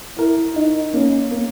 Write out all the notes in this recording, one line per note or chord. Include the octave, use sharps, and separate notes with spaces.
E4 A#4
D#4 D#5
A#3 C#4
A#3